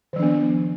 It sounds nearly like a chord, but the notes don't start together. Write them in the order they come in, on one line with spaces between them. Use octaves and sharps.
D#3 F3 D4 B3